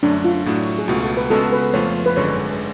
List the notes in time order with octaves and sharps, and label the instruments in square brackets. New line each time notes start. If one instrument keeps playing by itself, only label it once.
[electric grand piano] F#2 D3 F#3 A3 [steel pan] D4
[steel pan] F4
[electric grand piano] A2 F#3 A3 D4 F#4
[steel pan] G#4
[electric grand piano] C#2 B2 A3 F4 [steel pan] F#4
[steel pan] A4
B4
[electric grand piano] C#3 G#3 B3 F#4 [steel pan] A4
[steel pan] B4
[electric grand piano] F2 F3 A3 F4 [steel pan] C#5
[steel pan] B4
[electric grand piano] G#1 F#2 D3 G#3 [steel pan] C#5